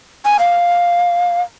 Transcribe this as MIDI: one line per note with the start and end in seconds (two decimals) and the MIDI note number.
0.25 0.37 80
0.39 1.41 77